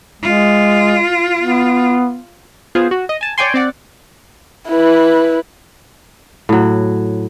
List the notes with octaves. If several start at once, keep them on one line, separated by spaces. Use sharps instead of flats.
G#3 F4
B3
B3 F4 G#4 C5
F#4
D#5
G#5 A5
C#5 D5 G5 G#5 C6
C4 D5 F#5
E4 B4
A2 F#3